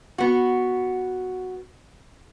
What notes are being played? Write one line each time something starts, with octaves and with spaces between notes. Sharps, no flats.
B3 F#4